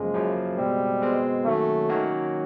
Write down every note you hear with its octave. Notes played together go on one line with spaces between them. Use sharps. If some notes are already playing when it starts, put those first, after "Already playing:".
Already playing: F#2 C#3 F3 G#3 A#3
F#2 C#3 F3 A#3
B2 G3 G#3 C4
B2 G#3 C4
D#3 F#3 A3 A#3 C#4 F#4
D#3 F#3 A#3 C#4 F#4